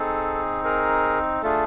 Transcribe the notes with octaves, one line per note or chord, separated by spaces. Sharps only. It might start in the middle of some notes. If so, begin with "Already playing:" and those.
Already playing: C4 D#4 G#4 A4
G#4 A#4
A3 D4 F4 G#4 A4